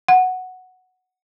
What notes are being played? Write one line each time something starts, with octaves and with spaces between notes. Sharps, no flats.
F#5